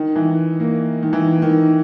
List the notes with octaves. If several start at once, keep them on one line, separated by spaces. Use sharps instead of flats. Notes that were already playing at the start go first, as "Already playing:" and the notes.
Already playing: D#3
E3
A#3
D#3
E3
D#3